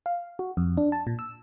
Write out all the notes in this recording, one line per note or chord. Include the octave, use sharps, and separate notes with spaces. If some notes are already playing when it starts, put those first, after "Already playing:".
F5
F#4
F2
D4
A5
A#2
E6